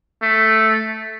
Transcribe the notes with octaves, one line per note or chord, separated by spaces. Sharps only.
A3